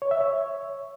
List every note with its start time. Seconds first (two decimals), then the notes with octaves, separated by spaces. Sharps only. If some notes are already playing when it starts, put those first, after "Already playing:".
0.02 C#5
0.11 E5
0.21 C#5